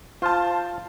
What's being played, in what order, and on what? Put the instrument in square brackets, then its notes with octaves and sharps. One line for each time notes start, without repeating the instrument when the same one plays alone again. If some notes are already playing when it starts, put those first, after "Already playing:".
[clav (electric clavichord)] F4 [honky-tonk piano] C5 A5